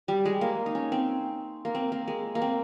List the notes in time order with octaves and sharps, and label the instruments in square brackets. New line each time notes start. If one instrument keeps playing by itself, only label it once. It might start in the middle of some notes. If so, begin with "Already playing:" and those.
[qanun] G3
G#3
A#3
D#4
C#4
C4
A#3
C4
A#3
G#3
A#3
C4